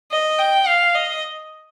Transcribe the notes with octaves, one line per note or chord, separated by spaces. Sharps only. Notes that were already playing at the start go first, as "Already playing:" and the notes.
D#5
G5
F5
D#5